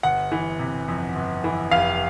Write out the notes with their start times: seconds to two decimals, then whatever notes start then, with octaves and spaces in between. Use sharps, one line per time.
0.03 G1 F#5
0.32 E3
0.59 C3
0.88 F2
1.16 G1
1.44 E3
1.71 F1 F5